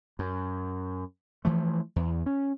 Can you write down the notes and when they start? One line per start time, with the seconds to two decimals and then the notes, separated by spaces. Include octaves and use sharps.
0.19 F#2
1.45 E3 F3 A3
1.96 E2
2.26 C#4